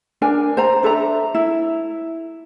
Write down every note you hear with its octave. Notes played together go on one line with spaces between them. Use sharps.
D4 A#4 G#5
C5 A#5
D4 A4 E5 A#5
E4